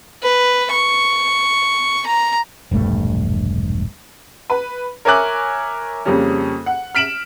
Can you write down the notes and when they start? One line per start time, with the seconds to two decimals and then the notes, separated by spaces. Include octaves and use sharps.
0.23 B4
0.71 C#6
2.06 A#5
2.71 E1 A#1 G2 A3
4.50 B4
5.05 A#4 C#5 E5 G#5 D6 F#6
6.05 F2 C#3 G3 A#3 C#4
6.66 F#5
6.95 F6 B6 D7 E7 F#7